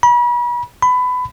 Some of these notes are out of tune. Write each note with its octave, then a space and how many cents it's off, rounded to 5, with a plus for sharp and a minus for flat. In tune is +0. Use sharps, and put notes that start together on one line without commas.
B5 -40
B5 +20